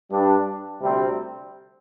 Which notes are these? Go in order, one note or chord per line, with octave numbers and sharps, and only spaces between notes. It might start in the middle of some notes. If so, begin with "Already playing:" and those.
G2 G3 D4
D2 C3 G3 C4